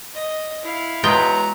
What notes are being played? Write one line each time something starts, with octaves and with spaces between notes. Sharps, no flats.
D#5
E4 F5
E2 F#3 G#3 B3 F4 G5 A#5